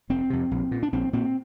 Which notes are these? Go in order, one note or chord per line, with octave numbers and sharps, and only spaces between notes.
F1 C4
F2 C3
A#1
A#2
D4
A#1 C4
A#2 C4